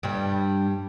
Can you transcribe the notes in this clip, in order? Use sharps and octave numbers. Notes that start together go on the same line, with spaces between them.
G2 G3